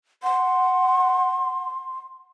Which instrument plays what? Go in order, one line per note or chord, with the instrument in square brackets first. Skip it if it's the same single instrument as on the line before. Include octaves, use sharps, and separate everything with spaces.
[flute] F#5 [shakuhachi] C6